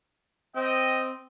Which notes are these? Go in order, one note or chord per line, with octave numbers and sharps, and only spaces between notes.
C4 D#5 G5